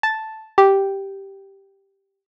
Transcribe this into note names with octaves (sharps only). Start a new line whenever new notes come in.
A5
G4